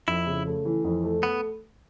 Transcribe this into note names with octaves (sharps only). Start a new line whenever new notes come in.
F2 E4
C#3
A3
E3
F2
A3
B3